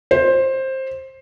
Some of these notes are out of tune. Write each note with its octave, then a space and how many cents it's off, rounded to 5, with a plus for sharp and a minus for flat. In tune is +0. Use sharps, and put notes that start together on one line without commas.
C5 +15